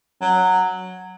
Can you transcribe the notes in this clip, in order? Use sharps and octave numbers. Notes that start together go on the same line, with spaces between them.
F#3